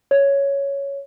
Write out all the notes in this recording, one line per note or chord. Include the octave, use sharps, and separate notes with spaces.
C#5